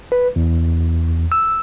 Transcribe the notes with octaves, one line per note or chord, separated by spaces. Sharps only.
B4
E2
E6